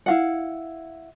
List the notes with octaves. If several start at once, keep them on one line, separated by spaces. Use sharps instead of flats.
E4 F5 F#5